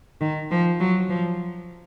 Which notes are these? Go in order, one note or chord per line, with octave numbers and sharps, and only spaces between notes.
D#3
F3
F#3
F3